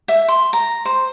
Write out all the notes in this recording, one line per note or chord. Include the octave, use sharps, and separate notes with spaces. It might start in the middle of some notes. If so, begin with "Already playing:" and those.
E5
C6
A#5
C5